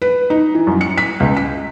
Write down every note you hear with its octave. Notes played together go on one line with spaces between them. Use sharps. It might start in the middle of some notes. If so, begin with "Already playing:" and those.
B4
D#4
E3
F#2
C#7
B6
C#2
B6